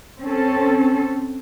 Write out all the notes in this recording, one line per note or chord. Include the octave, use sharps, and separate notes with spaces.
C4 C#4 A4